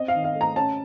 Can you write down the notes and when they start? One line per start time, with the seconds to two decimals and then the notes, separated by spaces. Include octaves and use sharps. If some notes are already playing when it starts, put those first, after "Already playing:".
Already playing: C4 D#5
0.08 F5
0.14 D#3
0.24 F5
0.35 A3
0.41 A#5
0.56 C#4 A5